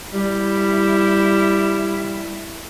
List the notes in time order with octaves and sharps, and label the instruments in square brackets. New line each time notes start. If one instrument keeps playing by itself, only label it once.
[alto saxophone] G3 [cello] E4